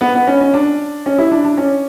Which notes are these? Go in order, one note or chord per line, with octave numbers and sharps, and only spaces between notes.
B3
B3
C#4
C#4
D4
C#4
E4
D4
D4
C#4